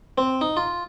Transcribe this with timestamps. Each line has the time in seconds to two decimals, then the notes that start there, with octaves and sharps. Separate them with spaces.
0.18 C4
0.41 D#4
0.57 F4